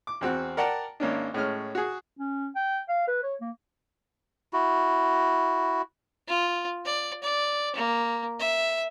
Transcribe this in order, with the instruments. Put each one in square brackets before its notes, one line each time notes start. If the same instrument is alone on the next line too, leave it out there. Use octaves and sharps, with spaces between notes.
[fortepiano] D6
E2 C4 F#4 F#6
A#4 D5 F#5 G5 A5 A#5
G#1 A#3 C#4 D4
A2 G#3 C#4 F6
F#4 G#4
[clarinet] C#4
G5
F5
B4
C#5
A#3
[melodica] E4 F#4
[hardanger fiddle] F4
D5
D5
A#3
E5